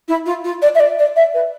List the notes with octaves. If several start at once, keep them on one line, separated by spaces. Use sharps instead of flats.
E4
F4
F4
D5
E5
D5
D5
E5
B4